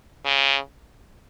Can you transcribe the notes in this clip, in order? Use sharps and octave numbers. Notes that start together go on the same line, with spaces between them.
C#3